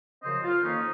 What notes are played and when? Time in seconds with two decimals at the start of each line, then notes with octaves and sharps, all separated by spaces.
0.23 F#2 C#3 F3 C4 C5 D#5
0.43 F4
0.63 F2 D#3 A#3 C#4 D#4